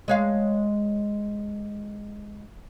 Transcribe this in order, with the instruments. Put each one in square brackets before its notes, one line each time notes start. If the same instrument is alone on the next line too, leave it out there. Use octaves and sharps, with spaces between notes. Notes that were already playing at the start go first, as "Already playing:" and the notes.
[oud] G#3 C#5 F5